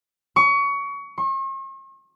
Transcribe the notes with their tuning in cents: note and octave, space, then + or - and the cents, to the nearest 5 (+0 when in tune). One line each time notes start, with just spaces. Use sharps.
C#6 +25
C#6 -45